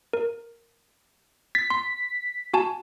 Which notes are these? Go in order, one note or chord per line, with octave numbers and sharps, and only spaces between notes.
A#4
A6 B6
C6
F#4 G#5 A5